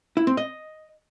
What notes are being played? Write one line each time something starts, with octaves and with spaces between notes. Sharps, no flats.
E4
C4
D#5